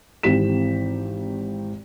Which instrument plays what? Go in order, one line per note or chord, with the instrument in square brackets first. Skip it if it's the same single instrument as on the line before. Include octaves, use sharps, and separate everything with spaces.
[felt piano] G#1 E3 C4 G4 B6 E7